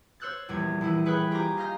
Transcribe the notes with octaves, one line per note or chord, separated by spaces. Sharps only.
C5 C#5 E6 F#6 G6 A6
A#1 E2 G3 G#6
A#1 E3 E4 D#7
G#4 B4 C#5 G5 B5 F#6
F4 G4 C5 G#5 A#5 D6
D#5 F5 A#5 F6 G6 A#6